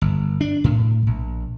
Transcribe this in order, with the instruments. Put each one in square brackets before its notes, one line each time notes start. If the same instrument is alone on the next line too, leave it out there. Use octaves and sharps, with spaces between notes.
[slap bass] G1
D4
A2
A#1